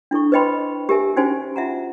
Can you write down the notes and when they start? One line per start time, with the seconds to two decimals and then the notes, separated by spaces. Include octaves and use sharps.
0.11 D4 E4 A4 C#6
0.32 B4 C5 D#5 G5 B5 C6
0.89 G4 A#4 E5 G#5
1.16 C#4 D#4 F#4 C5 G#5
1.56 F4 E5 F#5 A#5